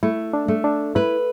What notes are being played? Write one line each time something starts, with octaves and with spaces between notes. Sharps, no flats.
A3 E4
D4
A3
D4
E4 B4